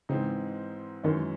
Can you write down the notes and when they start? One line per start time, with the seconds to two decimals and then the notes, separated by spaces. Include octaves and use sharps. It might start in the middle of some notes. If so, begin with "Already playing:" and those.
0.09 G#2 C#3 E3 C4 D#4
1.04 F#2 D#3 E3 G#3 C#4